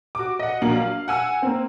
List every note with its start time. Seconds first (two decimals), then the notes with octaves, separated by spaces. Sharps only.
0.15 F#4 D6
0.39 D#5 F#5
0.62 A#1 F#3 A#3 F#7
0.76 F5
1.08 F#5 G#5 E6
1.42 A#3 C4